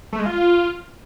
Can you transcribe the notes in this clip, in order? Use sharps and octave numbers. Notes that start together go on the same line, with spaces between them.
A3
G#3
F4